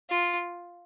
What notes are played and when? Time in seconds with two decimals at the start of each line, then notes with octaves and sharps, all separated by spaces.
0.10 F4